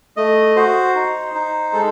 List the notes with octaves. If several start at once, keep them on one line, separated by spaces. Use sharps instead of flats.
A3 D#5
F#4 C5
D#4
D#4
G#3 A4